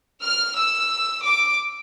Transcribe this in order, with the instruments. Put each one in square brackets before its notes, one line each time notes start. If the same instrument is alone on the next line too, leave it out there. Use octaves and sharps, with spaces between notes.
[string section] F6
E6
D6